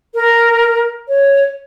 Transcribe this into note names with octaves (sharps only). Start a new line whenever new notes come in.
A#4
C#5